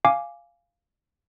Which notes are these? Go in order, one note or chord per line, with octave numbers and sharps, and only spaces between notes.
F5 G#5 D6